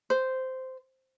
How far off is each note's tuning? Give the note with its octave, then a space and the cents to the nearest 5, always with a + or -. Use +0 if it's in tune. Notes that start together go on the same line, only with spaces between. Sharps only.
C5 -10